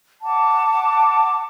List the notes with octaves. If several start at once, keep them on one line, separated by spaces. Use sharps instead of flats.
F#5 A5 D6